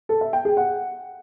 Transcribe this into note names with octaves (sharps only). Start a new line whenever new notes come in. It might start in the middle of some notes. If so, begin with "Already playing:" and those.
A4
E5
G5
G#4
F#5